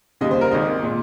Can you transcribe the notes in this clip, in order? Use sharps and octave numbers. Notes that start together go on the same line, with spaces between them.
D#2 C#3 G3 D#5
C5
A#4
G#1 G#2 D#3 G#3 D#5
A#2 G#3